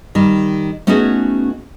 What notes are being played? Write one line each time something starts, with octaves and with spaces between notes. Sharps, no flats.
D#3 G3
A3 B3 C#4 D#4 F#4 G#4